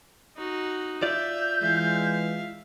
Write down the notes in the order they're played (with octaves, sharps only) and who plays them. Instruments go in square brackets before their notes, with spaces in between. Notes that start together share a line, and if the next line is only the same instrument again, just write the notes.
[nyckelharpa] D#4 F#4
[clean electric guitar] F4 D5 [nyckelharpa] E5 [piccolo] G6
[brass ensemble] E3 G#3 [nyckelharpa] E5 F5